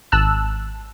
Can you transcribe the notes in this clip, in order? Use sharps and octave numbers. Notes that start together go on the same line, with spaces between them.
G#1 A5 E6 F#6